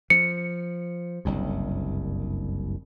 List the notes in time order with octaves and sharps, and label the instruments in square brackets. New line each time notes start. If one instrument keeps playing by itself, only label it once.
[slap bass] F3 [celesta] C#7
[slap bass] F#1 C2 G2